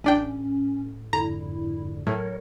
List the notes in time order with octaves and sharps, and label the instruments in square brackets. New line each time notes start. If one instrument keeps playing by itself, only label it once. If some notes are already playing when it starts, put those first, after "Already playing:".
[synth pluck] A1 D4 G5 [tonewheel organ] A2 [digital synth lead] C#4
[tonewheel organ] F2 G#2 D3 [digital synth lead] E4 [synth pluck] A#5
[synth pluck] A2 [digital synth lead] F#3 [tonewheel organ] A#4 C#5